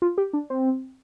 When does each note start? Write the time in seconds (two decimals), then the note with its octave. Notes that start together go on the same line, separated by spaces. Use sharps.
0.02 F4
0.18 G4
0.33 D4
0.50 C4